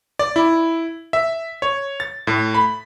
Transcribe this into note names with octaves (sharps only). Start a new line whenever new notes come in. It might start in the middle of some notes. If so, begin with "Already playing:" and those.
D5
E4
E5
C#5
A6
A2
B5